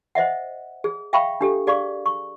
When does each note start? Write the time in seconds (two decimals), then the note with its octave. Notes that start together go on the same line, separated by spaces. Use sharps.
0.15 C5 D#5 E5 F#5
0.84 G#4
1.13 E5 F5 G5 B5 C#6
1.41 D4 G4 A4
1.67 G#4 D5 F5 C#6
2.06 C#6